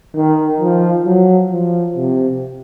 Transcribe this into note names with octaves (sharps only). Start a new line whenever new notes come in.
D#3
F3
F#3
F3
C3